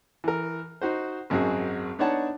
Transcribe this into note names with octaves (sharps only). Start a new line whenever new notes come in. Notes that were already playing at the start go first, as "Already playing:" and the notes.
E3 A#4
D#4 F#4 C5
G#1 F#2 C4 F#4 G#4
B3 D4 D#4 C#5 F#5 A5